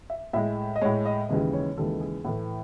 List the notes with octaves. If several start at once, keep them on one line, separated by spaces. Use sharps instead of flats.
E5
A2 G#3 E5
D#5
A2 G#3 C#5
D#5
D#2 C#3 E3 G#3 D#5
C#5
D#2 C#3 E3 G#3 A4
G#4
A2 E3 A3